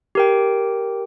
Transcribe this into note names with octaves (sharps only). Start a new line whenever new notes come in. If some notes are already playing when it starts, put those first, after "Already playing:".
G4 A#4 G5